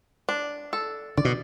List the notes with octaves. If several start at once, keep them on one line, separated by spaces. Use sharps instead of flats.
D4
A4
D3 D5
B2